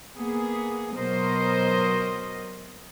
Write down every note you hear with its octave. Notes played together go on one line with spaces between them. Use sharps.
A#3 B3 G#4
B2 F#3 A#4 C5 D#5